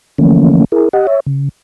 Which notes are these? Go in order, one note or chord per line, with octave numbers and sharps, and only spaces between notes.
D3 E3 F3 A3 A#3 C#4
E4 G#4 A#4
G4 D#5 F#5
C#5 E5
C#3